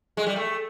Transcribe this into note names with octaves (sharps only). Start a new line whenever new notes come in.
G#3
G3
A3